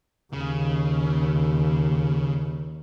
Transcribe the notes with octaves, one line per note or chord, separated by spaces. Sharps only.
D#2 C#3